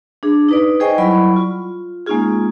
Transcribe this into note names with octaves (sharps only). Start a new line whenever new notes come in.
D4 G#4
D#4 B4 D5
G#4 C5 D#5 G5 G#5 C#6
F#3 G3 E4 D5 B5 C#6
F4
G#3 A#3 C#4 D#4 F4 G#4